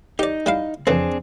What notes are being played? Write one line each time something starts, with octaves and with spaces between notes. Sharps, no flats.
D#4 G4 D5
G3 E4 F5
F2 C#3 E3 C4 D4 G#4